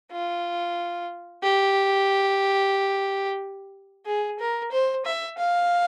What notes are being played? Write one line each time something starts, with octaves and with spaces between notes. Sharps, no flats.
F4
G4
G#4
A#4
C5
E5
F5